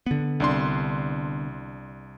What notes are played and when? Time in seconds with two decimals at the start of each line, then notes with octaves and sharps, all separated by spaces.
0.06 D3 B3
0.40 C2 D4 C6